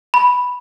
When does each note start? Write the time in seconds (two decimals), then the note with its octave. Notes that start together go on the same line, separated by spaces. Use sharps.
0.14 B5